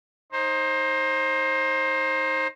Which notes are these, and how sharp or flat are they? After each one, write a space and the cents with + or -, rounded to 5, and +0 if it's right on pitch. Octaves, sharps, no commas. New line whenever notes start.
D#4 +5 C5 +25